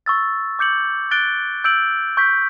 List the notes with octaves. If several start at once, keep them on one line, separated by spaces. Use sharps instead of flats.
C#6 E6 A6
D6 G6 C#7 F#7
F#6 A6 D7 G7
E6 G6 D7 F#7
C#6 G6 B6